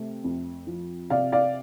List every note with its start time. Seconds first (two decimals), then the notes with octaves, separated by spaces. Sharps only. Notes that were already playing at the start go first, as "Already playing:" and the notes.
Already playing: C3 A3
0.24 F2
0.67 F3
1.10 C3 D5 F5
1.32 D5 F5